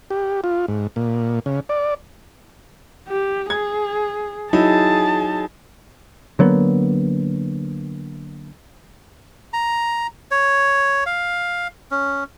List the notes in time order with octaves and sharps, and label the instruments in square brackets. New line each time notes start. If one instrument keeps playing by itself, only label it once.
[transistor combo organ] G4
F4
G#2
A#2
C#3
D5
[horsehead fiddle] G4
[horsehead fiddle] G#4 [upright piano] G#6
[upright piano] F#3 D#4 E4 [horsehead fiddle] G#4 A5
[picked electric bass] D3 F#3 A#3 B3
[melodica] A#5
C#5
F5
C#4